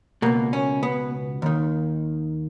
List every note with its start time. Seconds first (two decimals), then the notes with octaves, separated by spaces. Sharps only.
0.22 C#2 B2 A#3
0.53 C#4
0.83 B3
1.42 D#2 D#3